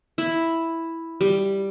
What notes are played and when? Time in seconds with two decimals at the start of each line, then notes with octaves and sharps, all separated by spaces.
0.18 E4
1.21 G3